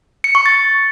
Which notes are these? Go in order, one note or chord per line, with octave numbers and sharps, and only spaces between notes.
C#7
C#6
A6